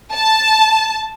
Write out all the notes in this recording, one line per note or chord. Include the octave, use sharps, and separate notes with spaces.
A5